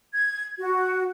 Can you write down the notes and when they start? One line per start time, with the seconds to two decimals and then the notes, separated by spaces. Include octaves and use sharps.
0.14 G#6
0.58 F#4